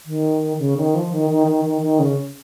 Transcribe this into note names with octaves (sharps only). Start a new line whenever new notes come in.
D#3
C#3
D#3
F3
D#3
D#3
D#3
D#3
D#3
C#3